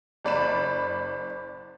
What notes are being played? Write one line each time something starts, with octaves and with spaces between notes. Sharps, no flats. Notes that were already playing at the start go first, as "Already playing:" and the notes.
F#1 D5 B5 E7